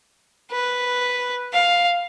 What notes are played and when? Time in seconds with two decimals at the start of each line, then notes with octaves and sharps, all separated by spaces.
0.51 B4
1.53 F5